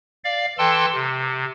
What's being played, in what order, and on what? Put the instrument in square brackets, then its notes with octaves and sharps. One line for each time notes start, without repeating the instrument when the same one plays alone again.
[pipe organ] D5 F5
E3 A4 G5 A5 C6
C3